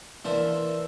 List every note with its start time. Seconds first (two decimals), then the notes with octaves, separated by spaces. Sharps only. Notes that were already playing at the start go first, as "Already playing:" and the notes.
0.25 E3 A#3 D4 C5 E5